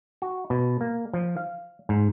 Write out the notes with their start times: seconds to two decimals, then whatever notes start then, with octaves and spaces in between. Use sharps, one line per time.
0.22 F#4
0.50 B2
0.81 A#3
1.13 F3
1.37 F5
1.89 G#2